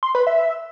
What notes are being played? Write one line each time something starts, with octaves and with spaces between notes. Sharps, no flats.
C6
B4
E5